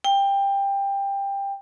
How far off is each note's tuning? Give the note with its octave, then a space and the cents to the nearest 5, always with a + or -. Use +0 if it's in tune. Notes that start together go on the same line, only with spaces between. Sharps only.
G5 +20